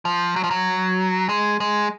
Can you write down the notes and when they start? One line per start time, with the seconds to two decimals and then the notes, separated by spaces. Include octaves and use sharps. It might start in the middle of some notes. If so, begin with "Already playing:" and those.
0.05 F3
0.36 F#3
0.44 F3
0.51 F#3
1.29 G#3
1.60 G#3